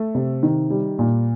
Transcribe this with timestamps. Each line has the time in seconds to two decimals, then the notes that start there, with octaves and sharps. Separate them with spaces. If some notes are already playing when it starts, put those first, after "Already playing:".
Already playing: A3
0.15 C3
0.43 D#3
0.70 G3
0.99 A#2